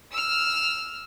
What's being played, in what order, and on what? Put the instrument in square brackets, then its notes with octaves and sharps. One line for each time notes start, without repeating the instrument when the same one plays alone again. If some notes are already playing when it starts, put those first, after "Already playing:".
[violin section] E6 F6